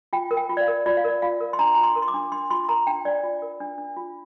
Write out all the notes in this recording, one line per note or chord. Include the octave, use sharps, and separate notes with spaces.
F4 G5
A#4
G5
F4
D5
F5
A#4
F4 D5
F5
A#4 D5
F4 F5
A#4
C6
D4 A#5
F4 A#5
C6
A#4
C6
D6
D4
D4 C6
F4 C6
A#4 A#5
D4 G5
D4 D5
F4
A#4
D4
D4
F4